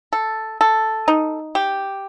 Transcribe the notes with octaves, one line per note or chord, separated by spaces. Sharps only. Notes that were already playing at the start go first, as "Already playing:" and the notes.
A4
A4
D#4
G4